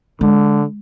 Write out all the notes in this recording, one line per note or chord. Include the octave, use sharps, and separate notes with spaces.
D3 G#3